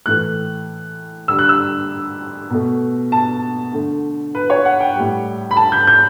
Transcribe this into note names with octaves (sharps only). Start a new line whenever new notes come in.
A2 E3 A3 F#6
D3 G3 E6
F#6
E6
B2 A3
A5
D3 A3
B4
C#5
F#5
G5
A2 G3
B5
A5
G6
G6